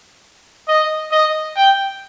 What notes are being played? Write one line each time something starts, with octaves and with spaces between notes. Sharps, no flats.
D#5
D#5
G5